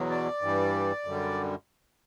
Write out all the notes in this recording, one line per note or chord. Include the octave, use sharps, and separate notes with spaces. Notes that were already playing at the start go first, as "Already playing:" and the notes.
Already playing: E2 B2 F#3
D5
G2 E3 G3
F#2 D3 G3